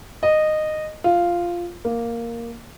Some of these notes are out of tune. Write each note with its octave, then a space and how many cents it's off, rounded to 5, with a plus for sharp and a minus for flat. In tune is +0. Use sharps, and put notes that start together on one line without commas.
D#5 -15
F4 -5
A#3 +0